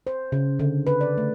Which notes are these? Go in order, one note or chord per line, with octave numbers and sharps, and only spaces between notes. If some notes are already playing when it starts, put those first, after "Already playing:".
C5
C#3
D3
B4
D5
A3